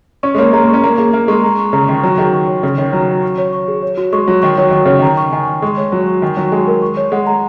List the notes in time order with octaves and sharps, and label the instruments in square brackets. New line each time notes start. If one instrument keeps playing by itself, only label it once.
[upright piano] C#4 [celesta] C#6
[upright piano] G#3
[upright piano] A#3 [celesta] C#5
[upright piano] G#3 [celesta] A#5
[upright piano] A#3
[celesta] C#6
[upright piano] C#4
[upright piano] A#3 [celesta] A#5
[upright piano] A#3 [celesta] G#4
[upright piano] A#3 [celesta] A#5
[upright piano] G#3 [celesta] C#6
[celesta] A#5
C#6
[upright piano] C#3 [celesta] A#5
[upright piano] D#3 [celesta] C#6
[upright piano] F#3 [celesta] A#5
[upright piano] D#3 [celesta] G#4
[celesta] C#6
C#5
[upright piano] C#3 [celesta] C#6
[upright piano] D#3 [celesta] C#5
[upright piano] F#3 [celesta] A#5
[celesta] C#6
C#6
C#5
C#6
G#4
C#5
F#4
[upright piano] G#3 [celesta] C#6
[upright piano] F#3 [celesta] C#5
[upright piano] D#3 [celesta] C#6
[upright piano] F#3 [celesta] C#5
[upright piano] D#3 [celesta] C#6
[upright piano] C#3 [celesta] C#5
[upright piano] D#3 [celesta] A#5
[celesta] C#6
[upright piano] D#3 [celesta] G#5
[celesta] C#6
[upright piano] G#3 [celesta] C#6
[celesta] C#5
[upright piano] F#3 [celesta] G#5
[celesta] C#6
[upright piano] D#3 [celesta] G#5
[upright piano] F#3 [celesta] C#6
[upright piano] G#3 [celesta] G#5
[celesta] A#4
C#6
C#5
[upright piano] G#3 [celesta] F#5
[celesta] A#5